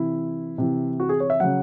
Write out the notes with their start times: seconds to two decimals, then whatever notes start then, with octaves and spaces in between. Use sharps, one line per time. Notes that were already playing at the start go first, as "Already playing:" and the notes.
Already playing: C3 E3 E4
0.58 C3 E3
1.00 F#4
1.09 G#4
1.20 C#5
1.30 E5
1.40 C#3 F#3 F#5